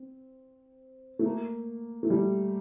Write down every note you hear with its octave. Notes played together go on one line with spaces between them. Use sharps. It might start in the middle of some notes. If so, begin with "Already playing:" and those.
Already playing: C4
A3
A#3
A3
G3